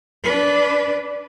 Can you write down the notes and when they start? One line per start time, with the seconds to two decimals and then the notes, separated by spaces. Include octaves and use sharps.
0.24 D4 B4